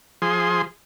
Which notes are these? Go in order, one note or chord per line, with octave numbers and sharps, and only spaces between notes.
F3 G#4 C6